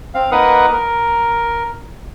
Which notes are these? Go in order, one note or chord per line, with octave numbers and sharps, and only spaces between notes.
C4 F5
A#3 D#4 A#4 B4 F#5 D#6
A#4